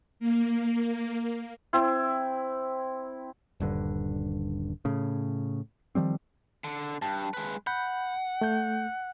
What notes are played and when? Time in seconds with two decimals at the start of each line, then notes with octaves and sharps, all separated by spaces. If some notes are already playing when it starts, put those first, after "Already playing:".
0.20 A#3
1.73 C4 E4
3.60 D#1 G2 D3
4.85 A2 C#3
5.95 D#3 F3 G3 C4
6.64 D3
7.02 G2 A5
7.34 G#3 B4
7.67 F#5 B5 G6
8.41 A3 G6